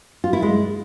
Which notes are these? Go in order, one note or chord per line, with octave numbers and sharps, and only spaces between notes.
F4
E4
G#3